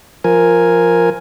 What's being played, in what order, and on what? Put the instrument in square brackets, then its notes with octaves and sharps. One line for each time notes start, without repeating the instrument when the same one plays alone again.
[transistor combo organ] F3 A#4 G#5